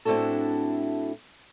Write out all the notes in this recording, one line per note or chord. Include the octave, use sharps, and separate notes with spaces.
A2 C4 D4 E4 F#4 A4